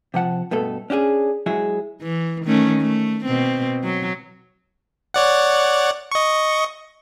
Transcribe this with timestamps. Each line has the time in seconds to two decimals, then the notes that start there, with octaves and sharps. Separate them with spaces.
0.14 C3 F3 F#5 A5
0.51 G2 B2 A3 A4
0.90 C#4 D4 G4 G#4
1.46 F#3 G#3 E4 G#4
2.02 E3
2.45 D#3 A3 C#4
2.80 A3
3.25 B2 C4
3.83 F#3
5.14 C#5 D5 F#5
6.12 D#5 C#6